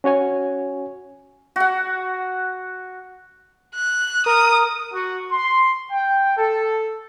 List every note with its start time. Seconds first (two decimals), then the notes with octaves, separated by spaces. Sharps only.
0.04 C#4 F#4 C#5 G#5
1.56 F#4 F#5
3.75 F#6
4.26 A#4 D#6
4.92 F#4
5.30 C6
5.90 G5
6.36 A4